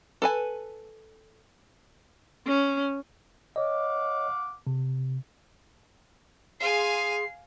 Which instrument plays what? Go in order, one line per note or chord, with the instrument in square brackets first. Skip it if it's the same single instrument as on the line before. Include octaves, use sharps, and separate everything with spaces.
[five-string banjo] A4 B4 G#5
[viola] C#4
[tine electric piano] C#5 D#5 [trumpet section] F5 F#5 D6
[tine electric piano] C3
[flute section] G#4 C6 [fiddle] F5 G#5 [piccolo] C7